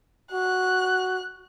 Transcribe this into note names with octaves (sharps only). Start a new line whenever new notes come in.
F#4 F#6